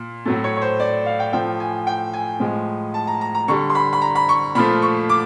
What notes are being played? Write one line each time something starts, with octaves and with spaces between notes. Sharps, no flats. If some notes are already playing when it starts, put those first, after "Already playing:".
Already playing: A#2
A2 F#3 A3
C#5
C#5
C5
D5
F5
G5
A2 F3 A3 G5
G#5
G5
G#5
A2 F3 G#3
A5
A#5
A#5
A#5
D3 G3 C#6
C6
B5
B5
A#5
B5
C#6
A#2 F3 A3 B5
C#6
D6